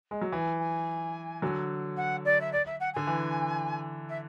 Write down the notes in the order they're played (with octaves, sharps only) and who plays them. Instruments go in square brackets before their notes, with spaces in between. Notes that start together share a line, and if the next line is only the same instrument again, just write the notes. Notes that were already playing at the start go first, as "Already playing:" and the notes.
[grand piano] G#3
F#3
[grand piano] E3 [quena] G#5
[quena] G#5
[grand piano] D3 F#3
[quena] F#5
D5
E5
D5
E5
F#5
[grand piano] D3 [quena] G#5
[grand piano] E3
[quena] E5